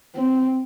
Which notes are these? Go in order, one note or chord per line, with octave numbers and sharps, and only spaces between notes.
C4